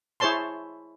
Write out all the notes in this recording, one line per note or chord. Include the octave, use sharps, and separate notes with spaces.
E4 G#4 C5 C#5 A5 C6